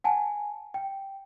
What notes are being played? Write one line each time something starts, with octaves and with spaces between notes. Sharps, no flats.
F#5 G#5 A5
G5